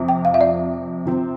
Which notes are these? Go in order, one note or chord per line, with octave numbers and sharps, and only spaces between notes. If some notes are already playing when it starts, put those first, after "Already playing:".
Already playing: F2 C3 F3
G5
F5
E5
D5
C3 F3 C4